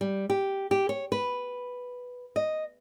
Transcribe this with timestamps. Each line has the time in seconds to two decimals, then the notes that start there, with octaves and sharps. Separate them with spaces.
0.01 G3
0.30 G4
0.71 G4
0.89 C#5
1.12 B4
2.36 D#5